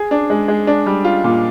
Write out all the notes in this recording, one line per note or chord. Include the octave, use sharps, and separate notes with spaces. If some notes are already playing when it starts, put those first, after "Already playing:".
Already playing: G#4
D4
G#3
G#3
D4
G3
F4
A#2